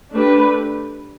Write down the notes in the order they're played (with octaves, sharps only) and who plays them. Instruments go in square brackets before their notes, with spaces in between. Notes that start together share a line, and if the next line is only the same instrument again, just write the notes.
[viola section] A3 D4 G4 B4